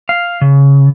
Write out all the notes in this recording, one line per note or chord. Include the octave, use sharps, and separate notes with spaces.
F5
C#3